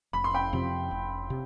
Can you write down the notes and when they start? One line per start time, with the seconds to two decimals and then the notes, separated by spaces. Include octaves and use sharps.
0.13 F1 B5
0.24 C6
0.34 G5 B5
0.53 F2 C3 F3
0.91 F1
1.30 C3